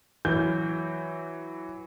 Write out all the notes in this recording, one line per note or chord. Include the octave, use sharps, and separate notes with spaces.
E3 F#3 G6